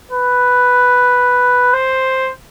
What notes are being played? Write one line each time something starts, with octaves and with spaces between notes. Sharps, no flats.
B4
C5